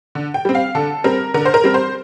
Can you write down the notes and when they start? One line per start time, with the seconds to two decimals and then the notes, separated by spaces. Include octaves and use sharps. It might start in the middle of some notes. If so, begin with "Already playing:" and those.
0.15 D3
0.34 G5
0.45 G3 C4
0.55 F5
0.75 D3 A4
1.04 G3 C4 A#4
1.34 D3 A#4
1.45 C5
1.54 A#4
1.64 G3 C4
1.74 C5